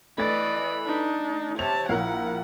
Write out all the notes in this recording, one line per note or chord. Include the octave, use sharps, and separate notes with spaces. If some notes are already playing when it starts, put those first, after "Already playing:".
E3 A3 D5 D#5 B5 A6
D4 D#4
C3 C#5 A5 F7
A#1 E4 A#4 F5 F#5